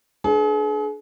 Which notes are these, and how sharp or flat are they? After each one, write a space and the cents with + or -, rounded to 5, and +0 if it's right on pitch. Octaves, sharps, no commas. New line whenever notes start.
D4 +0 G#4 +40 B4 +0